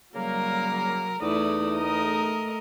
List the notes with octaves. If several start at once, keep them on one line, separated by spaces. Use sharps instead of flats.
C#3 F#3 G3 A#3 A#4
E2 A3 D#4 E4 D5 D#6
A3 A#4 D#5